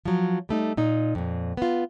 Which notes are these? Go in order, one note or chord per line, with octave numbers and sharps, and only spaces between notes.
F3 F#3
G3 A3 D#4
A#2 D#4
F2 A#2
B3 F4